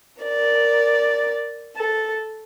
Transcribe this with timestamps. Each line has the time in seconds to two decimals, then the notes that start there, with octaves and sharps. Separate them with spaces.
0.23 A#4 D5
1.76 A4